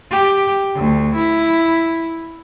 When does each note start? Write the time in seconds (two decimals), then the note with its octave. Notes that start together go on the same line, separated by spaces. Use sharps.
0.11 G4
0.76 D2
1.15 E4